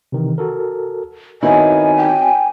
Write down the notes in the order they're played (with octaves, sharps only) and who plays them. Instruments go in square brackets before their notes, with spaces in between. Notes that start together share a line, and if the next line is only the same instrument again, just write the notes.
[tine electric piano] C3 D#3 E3
F#4 A4 A#4
[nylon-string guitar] D#3 B3 E4 [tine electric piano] C4 F#4 C#5 [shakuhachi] D#5 [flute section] G#5
[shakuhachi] G5